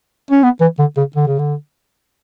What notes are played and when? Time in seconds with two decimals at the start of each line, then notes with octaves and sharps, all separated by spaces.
0.31 C#4
0.43 B3
0.61 E3
0.79 D3
0.97 C#3
1.16 D3
1.27 C#3
1.39 D3